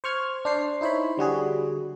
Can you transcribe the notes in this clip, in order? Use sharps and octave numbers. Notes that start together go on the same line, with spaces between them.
C5 C#6 F6 G#6
D4 C5 C7
D#4 E4 C5 C#5 B5
D3 G3 F#4 G#4